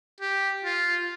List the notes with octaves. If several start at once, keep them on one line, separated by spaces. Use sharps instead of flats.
G4
F4